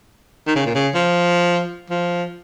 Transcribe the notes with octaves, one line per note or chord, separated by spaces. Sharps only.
D#3
C#3
A#2
C#3
F3
F3